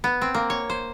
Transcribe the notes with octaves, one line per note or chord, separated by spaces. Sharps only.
B3
C4
A#3
C#5
C5